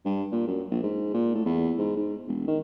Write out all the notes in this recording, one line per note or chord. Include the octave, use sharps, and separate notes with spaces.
G2
A#2
F#2
A#1
G#2
A#2
A2
E2
G#2
G#2
E1
D#3